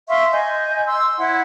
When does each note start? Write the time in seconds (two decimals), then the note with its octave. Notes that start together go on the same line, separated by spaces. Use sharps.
0.08 E5 F5 C6 C#6
0.32 D#5 G#5 G6
0.86 C6 E6
1.18 E4 C#5 F#5